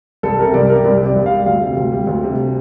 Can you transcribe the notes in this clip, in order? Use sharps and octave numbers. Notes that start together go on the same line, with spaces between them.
C2 A4
C3 A#4
C2 D5
G3 A#4
C2 D5
C3
D5
C2
G3 F5
D2 F5
C3
D2
G3
D2
C3